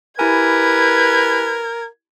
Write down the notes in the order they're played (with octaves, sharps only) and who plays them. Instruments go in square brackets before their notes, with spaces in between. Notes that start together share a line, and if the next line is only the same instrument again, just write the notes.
[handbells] E4 G4 G#5 [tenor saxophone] A#4 [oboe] B4 [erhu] G#6